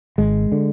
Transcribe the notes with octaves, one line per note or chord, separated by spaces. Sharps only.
G#1 G#3
D3